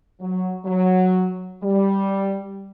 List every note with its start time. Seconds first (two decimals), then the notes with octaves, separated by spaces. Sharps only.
0.21 F#3
0.65 F#3
1.63 G3